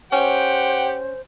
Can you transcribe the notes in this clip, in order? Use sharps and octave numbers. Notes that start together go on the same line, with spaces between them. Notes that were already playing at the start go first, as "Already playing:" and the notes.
C#4 G4 C5 F#5 G5